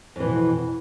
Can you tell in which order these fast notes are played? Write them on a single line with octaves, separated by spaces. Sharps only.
F2 E3 B2